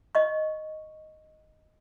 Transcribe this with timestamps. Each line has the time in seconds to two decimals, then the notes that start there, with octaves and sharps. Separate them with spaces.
0.15 D#5 C#6